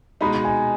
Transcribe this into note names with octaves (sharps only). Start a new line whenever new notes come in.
B2 G#3 D#4 B5
G#5